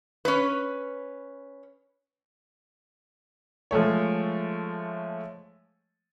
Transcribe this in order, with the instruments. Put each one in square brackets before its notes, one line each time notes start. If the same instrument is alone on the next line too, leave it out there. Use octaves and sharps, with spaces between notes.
[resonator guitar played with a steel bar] C#4 B4
[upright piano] F3 G#3 A3 C#5